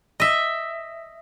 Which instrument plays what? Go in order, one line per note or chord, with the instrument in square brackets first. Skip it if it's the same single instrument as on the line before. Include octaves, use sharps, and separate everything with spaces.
[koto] D#5 E5